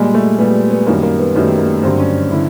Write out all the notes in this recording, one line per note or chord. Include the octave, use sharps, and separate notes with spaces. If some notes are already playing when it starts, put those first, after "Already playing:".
Already playing: A#2 G3 G#3
A3
A#2 G3 B3
B3
F#2 D#3 G3 A#3
A#3
B3
F#2 D#3 G3 A3
A#3
G2 D3 F#3 C4
C#4
D3 E4